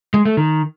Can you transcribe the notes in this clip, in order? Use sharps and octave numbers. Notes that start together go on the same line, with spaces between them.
G#3
A3
D#3